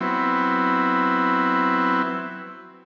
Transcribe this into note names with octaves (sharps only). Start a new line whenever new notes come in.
F#3 B3 C4 E4